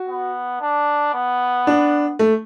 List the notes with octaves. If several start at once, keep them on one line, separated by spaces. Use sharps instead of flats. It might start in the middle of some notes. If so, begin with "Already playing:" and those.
Already playing: F#4
B3
D4
B3
D4
A3